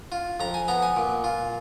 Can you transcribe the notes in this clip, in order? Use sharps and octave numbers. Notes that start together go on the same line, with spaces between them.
F4
F2 A#5
G#5
B3 A#5
G#5
A#2
F4